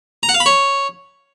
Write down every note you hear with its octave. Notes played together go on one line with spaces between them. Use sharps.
A#5
F#5
F5
B5
C#5